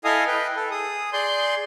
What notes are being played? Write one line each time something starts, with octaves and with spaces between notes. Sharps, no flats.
E4 A4 D#5 F5 G#5 D#6
B4 G5
A4
G#4 D#6
G#4 D5 C6 G6